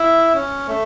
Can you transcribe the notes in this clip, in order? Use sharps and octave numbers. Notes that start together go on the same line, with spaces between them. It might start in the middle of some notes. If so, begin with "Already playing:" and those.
Already playing: E4
C#4
A3